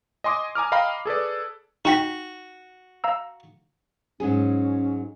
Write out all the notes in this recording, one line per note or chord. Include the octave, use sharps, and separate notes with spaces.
D#5 G#5 C6 D6 D#6
G#5 A#5 D6 F6
D#5 F5 G5 A#5 B5 F6
G#4 A4 B4 D5
D#4 F#4 G5 B6
F5 A#5 E6
G#2 F#3 C#4 G#4